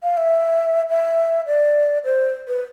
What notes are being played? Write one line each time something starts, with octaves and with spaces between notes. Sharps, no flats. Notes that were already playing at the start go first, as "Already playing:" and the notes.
F5
E5
E5
D5
C5
B4